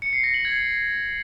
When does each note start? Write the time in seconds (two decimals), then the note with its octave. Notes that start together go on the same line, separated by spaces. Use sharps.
0.02 C#7
0.13 C7
0.24 A#6
0.34 F#7
0.45 G#6